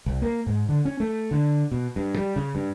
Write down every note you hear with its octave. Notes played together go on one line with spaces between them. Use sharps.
C2
A#3
G#2
D3
C#4
A3
D3
B2
G2
G3
C#3
G2